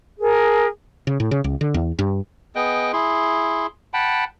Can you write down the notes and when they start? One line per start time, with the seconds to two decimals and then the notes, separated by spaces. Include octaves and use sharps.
0.19 G#4 A#4
1.07 C#3
1.20 A2
1.31 C#3
1.44 C#2
1.61 D3
1.74 E2
1.99 G2
2.56 B3 G#4 D#5 G5
2.93 E4 G#4 C6
3.94 F#5 G5 A5 B5